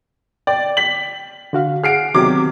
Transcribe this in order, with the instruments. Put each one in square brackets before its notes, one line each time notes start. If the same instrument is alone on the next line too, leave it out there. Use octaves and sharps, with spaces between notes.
[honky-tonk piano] D5 [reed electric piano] G5
[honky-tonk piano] B6 F#7
[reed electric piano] D3 F#4 F5
[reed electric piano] G#4 F#5 [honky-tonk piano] F6 C7 D7
[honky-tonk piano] C3 F#3 D6 [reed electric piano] D#3 B3 G4